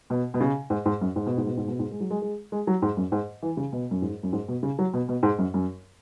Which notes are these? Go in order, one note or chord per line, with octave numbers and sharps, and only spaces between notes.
B2
B2
C#3
G#2
G#2
F#2
G#2
B2
G#2
B2
G#2
B2
G#2
G#3
F#3
G#3
G#3
G#3
F#3
G#2
F#2
G#2
E3
C#3
B2
F#2
G#2
F#2
G#2
B2
C#3
F#3
B2
B2
G#2
F#2
F#2